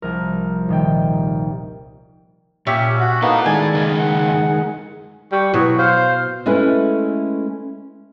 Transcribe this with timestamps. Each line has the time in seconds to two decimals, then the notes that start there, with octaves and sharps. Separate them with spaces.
0.02 C2 F3 A#4
0.68 D#1 D#3 G5
2.67 A#2 C#4 G4 E5
3.00 F#4 F#5
3.22 A#3 B3 D#4 E4 A4
3.46 D#3 G#3 D5 G#5
3.74 F#2 C#3 A#4
3.99 F#5
5.32 G3 C#6
5.54 B2 F#3 E4
5.79 C5 F5
6.46 G#3 A3 C#4 E4 A4 B4